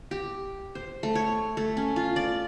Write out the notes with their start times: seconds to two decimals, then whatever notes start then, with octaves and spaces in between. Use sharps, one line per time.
0.11 G4
0.75 C5
1.03 A3
1.15 C#5
1.57 A3
1.77 C#4
1.96 F4
2.16 D5